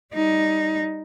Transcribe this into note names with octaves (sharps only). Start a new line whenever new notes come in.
G3 D#4